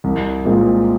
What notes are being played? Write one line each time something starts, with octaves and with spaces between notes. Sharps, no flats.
C2
A#2 G#3 C4